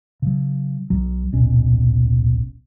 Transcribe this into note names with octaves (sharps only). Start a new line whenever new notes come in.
C#3 F#3
B1 F#3
D1 A#1 B2 C#4